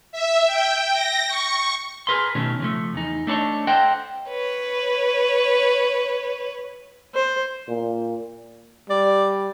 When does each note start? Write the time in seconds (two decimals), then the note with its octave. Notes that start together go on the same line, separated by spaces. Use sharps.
0.12 E5
0.46 G5
0.93 A#6
1.28 C#6
2.07 G#4 A#4 B4 E5 C6
2.35 B2 D#3 A3 C#4
2.60 C#3 F3 A3
2.95 E2 D#4
3.27 A3 D4 B4 C#5 D#5
3.67 A4 C5 D#5 F#5 G5
4.29 B4 C#5
7.14 C5
7.68 A#2
8.90 G3 D5